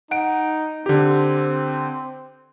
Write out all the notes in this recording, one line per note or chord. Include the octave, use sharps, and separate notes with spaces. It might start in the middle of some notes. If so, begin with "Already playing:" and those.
D#4 F#5 D7
D3 C4 G4